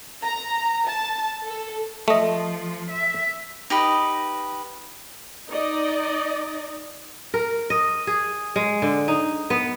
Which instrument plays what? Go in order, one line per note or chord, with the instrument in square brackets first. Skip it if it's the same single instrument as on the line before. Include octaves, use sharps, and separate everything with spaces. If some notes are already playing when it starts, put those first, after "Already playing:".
[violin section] A#5
A5
A4
[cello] F3 [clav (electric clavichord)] A3 D#5
[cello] E5
[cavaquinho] D#4 G4 B4 D#5
[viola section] D#4 D5 D#5
[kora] A#4
D#5
G#4
G#3
D3
D#4
B3